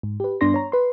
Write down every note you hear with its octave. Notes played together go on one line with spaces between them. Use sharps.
G#2
G4 B4
G2 B3 D4 D5 C6 A#6
C#5 A#5
B4 C6